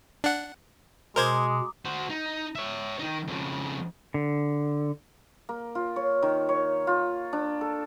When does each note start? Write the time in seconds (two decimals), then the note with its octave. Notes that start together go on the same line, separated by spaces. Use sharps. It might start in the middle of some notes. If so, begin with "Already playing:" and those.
0.24 D4 F#5
1.16 B2 G#3 A#4 C5 A#5 D6 D#6 G#6
1.85 F#4 C5
2.10 D#4
2.55 C#5 E5
2.99 D#3 D#4
3.28 F2 C#3
4.14 D3
5.49 A#3
5.75 F4
5.96 C#5
6.23 D#3
6.49 C#5
6.87 F4
7.33 D4
7.61 A4